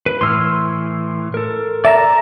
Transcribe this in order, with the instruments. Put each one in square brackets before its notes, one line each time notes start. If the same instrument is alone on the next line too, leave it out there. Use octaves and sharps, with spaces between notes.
[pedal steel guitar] B4
[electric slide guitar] A2 E3 [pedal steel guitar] C6 E6 F6
[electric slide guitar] A4 A#4
[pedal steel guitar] D5 A5 A#5 [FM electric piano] E5